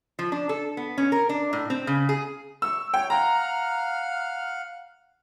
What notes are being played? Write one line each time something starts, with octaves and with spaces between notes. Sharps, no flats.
F3
D4
A4
B3
C#4
A#4
D4
A2
C4
C#3
G#4
C#6 E6
C#5 G5
F5 F#5 A#5 F6